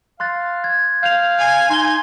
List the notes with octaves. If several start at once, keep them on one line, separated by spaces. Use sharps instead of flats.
F5 C6 F#6 A6
G#6
F5 G6 F7
G#5 C7 F7
D#4 C6 G7